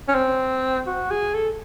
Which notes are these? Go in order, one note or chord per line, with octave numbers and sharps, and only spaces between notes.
C#4
C4
F#4
G#4
A4